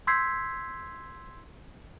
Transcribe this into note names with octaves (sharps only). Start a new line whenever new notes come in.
C6 E6 G6 G#6 B6 C7